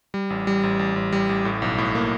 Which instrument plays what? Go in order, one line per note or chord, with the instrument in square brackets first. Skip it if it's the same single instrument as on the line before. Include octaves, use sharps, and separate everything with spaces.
[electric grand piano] G3
A1
G3
A1
A1
A1
G3
A1
A2
B1
A2
A#3